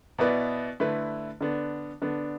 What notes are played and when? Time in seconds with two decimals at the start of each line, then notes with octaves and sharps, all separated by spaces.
0.18 B2 B3 E4 B4 D5
0.80 D3 A3 E4 B4
1.41 D3 B3 D4
2.02 D3 B3 D4